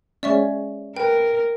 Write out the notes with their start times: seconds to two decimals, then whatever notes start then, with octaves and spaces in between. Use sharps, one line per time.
0.23 G#3 C#4 D5 E5 C#6
0.96 A#4 B4 G5